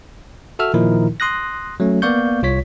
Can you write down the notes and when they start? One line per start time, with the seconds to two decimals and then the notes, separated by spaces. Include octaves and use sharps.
0.59 F#4 A4 E5 E6 F6
0.74 A#2 D#3 F3 D#4 E4 A#4
1.20 C6 D#6 F#6 A#6
1.80 F#3 A3 C#4
2.02 A#3 B3 D5 F5 C#6 G6
2.43 C2 F4 C#5 B6